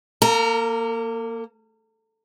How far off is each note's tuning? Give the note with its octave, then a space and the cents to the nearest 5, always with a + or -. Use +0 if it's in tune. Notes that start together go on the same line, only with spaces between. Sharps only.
A#3 +0 A#4 -45 A#5 +5